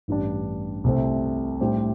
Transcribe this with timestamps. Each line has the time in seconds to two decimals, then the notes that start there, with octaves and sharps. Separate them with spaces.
0.08 A1 G2 G3 D4
0.84 C2 C3 A3 C4
1.60 A2 G3 D4 G4 C5